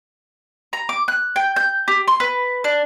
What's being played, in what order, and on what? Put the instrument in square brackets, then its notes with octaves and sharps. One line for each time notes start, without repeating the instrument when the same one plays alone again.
[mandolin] A#5
D6
F#6
G5
G6
G4
C6
B4
D4